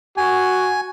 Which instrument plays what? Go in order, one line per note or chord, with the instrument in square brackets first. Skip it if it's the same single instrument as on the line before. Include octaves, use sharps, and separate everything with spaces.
[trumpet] F#4 [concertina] G#5